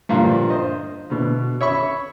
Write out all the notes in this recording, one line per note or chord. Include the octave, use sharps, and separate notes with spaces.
G2 A#2 D3 F3 A#3
C5 D#5
B2 D3
C#5 E5 B5 C#6